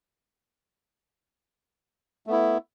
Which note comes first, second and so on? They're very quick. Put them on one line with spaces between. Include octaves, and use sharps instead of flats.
A3 B3 E4